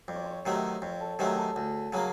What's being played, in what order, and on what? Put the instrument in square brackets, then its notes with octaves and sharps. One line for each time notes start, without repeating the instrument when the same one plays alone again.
[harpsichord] F2 [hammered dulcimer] D5
[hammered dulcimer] C#5
C5
C#5
[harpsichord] C3 D#3 F#3 A3
[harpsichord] F2 [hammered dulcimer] C#5
[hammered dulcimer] A4
[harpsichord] C3 D#3 F#3 A3 [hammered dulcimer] G#4
[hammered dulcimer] A4
[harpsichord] D2
C#3 F#3 A#3